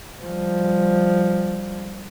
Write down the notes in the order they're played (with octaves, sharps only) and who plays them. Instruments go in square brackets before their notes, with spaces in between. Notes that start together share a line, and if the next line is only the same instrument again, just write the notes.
[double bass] F3 G3